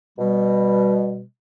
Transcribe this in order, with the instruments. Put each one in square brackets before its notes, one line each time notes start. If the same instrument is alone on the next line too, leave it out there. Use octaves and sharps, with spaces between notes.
[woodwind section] B2 G3